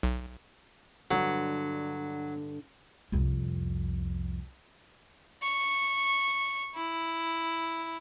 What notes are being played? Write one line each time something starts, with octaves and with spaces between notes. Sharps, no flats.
B1
G2 D3 F#3
C2 F2
C#6
E4